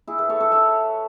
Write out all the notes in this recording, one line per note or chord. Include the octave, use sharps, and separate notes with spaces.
E4 G#4
G#4 B4
A4 C#5
A4 C#5
C#5 E5